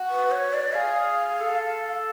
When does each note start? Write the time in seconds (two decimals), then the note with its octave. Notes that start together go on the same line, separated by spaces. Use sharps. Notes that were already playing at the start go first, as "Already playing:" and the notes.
Already playing: F#4
0.10 B4
0.32 C#5
0.53 D5
0.75 G#4 F5
1.30 G#4
1.40 A4